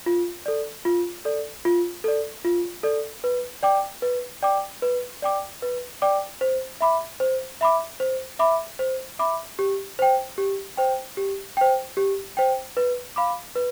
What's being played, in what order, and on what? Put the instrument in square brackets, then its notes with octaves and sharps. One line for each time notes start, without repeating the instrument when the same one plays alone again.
[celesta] F4
A4 D5
F4
A4 D5
F4
A4 D5
F4
A4 D5
B4
D5 G5 D6
B4
D5 G5 D6
B4
D5 G5 D6
B4
D5 G5 D6
C5
E5 B5 D6
C5
E5 B5 D6
C5
E5 B5 D6
C5
E5 B5 D6
G4
C5 G5
G4
C5 G5
G4
C5 G5
G4
C5 G5
B4
F5 B5 D6
B4